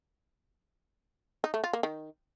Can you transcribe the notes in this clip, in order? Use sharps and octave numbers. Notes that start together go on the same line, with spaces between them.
D#4
A3
F4
A#3
D#3